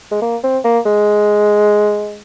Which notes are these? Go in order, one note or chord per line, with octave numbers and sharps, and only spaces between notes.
G#3
A#3
C4
A#3
G#3